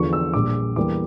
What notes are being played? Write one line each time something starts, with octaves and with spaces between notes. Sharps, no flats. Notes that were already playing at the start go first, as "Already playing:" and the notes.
Already playing: E2 D3 F3 C#6
E6
A#1 A#2 G3 D6
E2 E3 G3 A#3 D6